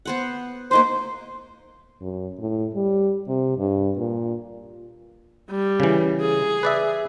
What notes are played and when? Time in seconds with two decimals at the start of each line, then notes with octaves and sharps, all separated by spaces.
0.05 B3 C5 F#5
0.71 A#3 D#4 B4 C5
2.01 F#2
2.39 A2
2.75 G3
3.28 C3
3.58 G2
3.98 A#2
5.50 G3
5.80 C#3 E3
6.21 G#4
6.63 B4 D5 E5